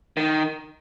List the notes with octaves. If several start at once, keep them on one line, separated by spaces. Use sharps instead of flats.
D#3